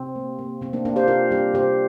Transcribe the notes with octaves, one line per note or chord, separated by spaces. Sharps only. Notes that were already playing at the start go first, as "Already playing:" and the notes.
Already playing: C3 C4
A#3
A#3
C3 C4
A#3 D4
A#3 D4
G4 C5
C3 F4 A#4
G3 D4 G4
C3 G4 C5